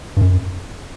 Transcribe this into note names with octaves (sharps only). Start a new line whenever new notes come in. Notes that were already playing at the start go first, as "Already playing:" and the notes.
G2
F#2